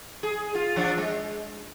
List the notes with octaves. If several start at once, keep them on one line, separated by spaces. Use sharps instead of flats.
G#4
F4
F3 D4
G#3